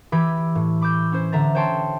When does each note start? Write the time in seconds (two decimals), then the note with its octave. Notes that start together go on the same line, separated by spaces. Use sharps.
0.12 E3 G4 B5 E6 G#6
0.55 A2
0.81 B5 D6 E6 G6
1.12 C#4 E4 C5
1.32 D3 E5 A#5 A6
1.55 C5 C#5 G5 A5 C6